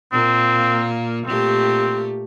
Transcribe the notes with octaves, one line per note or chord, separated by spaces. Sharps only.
A#2 A#3 C4
A#2 A3 C4 G4